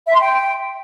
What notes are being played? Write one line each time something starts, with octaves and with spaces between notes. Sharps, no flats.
E5
C6
G5